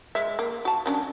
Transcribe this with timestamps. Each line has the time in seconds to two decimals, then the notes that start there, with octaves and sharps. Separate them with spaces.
0.15 G#3 E5
0.39 A#3
0.65 F#4 A5
0.86 F#3 C#4 D4